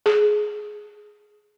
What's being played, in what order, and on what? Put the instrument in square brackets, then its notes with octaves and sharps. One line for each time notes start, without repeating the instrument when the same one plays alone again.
[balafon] G#4